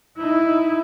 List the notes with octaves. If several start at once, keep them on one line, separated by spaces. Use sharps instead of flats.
D#4 E4